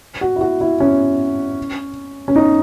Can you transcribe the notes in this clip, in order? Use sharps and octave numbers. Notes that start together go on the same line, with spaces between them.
F#4
E4
F#4
E4
C#4
C#4
D#4